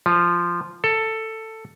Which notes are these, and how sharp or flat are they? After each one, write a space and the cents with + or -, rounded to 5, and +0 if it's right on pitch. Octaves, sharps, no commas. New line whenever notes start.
F3 -10
A4 +10